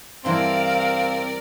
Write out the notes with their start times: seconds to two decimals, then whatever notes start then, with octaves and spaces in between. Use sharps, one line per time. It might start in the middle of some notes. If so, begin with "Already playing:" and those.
0.25 G2 E3 C4 A#4 D5 F5 C6